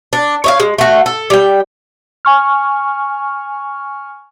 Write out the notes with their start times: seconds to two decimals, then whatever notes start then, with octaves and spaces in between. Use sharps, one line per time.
0.13 D4
0.44 C#5 D#5 F5
0.60 G#3
0.78 A3 F#4
1.06 A4
1.30 G3 G5
2.25 G#5 C#6 F6